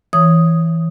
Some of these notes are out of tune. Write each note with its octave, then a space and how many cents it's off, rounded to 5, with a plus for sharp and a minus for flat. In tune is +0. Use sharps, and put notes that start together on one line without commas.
E3 +0 C#5 +0 D#6 +0